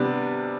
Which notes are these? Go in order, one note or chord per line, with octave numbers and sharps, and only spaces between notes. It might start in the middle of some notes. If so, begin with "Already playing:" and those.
Already playing: C3 G3 B3 D4